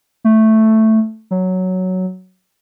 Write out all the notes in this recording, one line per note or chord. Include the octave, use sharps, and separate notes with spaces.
A3
F#3